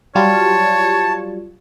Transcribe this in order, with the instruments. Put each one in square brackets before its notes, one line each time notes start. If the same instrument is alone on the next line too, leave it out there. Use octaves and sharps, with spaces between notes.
[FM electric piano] F#3 G3 F4 [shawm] C#5 [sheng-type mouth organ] A5